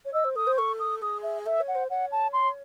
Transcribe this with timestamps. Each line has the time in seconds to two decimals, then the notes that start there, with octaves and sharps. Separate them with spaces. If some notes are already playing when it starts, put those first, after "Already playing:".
0.05 C#5
0.13 D#5 E6
0.24 C5
0.35 A4 D#6
0.47 C5
0.57 A4 C#6
0.80 D#6
1.01 G#4 D#6
1.23 E5
1.46 A4 E5
1.60 C#5
1.68 F#5
1.75 C5
1.90 C#5 F#5
2.12 A5
2.33 C6